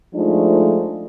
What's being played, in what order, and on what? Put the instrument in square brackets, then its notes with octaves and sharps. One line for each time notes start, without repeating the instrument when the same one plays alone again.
[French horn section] F3 G#3 A3 D4 D#4